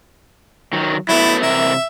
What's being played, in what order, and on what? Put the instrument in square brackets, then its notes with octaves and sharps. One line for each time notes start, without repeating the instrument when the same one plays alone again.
[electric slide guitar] D#3 F#3
[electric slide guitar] F#3 A3 B3 [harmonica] E4
[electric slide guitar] C3 E3 A#4 [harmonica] E5